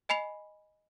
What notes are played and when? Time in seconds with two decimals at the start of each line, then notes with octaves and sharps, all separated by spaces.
0.09 D#5 G#5 B5 C7 F7